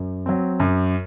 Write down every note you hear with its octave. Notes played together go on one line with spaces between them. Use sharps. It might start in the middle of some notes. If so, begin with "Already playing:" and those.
Already playing: F#2
F#3 C4
F#2